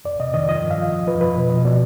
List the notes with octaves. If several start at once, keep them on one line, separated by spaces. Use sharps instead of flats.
F2 D5
C3 D#5
D#3 D#5
D5
F3 D#5
G2
F5
F3
F2 D#5
F3 B4
F3 B4
B2
B2 D#5
B2 D5